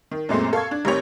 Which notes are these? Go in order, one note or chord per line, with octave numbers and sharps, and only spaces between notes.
D#3
F#2 A#2 G#3 A3 C4
A4 F5 C#6 G#6
D4
A1 D#3 C4 G4 C#5 F7